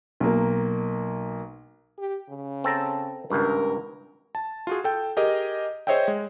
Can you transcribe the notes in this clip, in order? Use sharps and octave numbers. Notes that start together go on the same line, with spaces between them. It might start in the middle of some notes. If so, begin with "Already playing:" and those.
B1 A#3
G4
C#3
C4 A4 A#5
G#1 C#2 G2 A#4
A5
F4 F#4 G#4
A4 G5
G4 G#4 A#4 D#5
G#4 C5 C#5 D#5 E5 G5
G#3